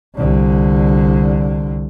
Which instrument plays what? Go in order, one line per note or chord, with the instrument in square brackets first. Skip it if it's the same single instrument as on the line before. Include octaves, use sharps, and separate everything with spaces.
[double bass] C2 D3